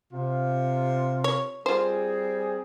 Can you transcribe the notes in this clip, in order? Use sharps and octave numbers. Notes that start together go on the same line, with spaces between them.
C3 F4
C#5
G3 C4 F4 G#4 C5